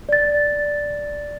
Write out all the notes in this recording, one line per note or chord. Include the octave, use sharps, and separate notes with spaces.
D5 A6